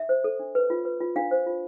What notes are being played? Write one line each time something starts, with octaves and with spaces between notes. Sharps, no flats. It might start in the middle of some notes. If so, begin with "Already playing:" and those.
Already playing: E5
C5
A4
D4
B4
F4
B4
F4
D4 F5
C5
F4